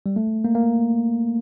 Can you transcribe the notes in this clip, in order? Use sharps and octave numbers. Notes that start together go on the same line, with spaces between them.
G3
A3
A#3
A#3